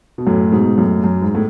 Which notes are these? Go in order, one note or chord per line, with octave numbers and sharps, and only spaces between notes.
B2
F#2 A2
G#2 B2
F#2 A2
F#2
G#2
A2